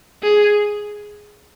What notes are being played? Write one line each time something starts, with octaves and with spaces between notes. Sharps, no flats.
G#4